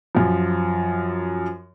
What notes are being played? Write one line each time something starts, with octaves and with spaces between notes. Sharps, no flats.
F#2 F3